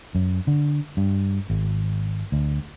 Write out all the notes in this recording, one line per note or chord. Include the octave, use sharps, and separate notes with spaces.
F#2
D3
G2
G#1
D2